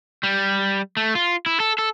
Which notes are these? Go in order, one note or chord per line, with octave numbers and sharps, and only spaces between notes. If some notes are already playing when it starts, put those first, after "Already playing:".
G3
A3
F4
E4
A4
A4